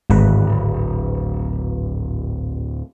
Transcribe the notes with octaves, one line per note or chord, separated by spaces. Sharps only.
D1 G#1 B4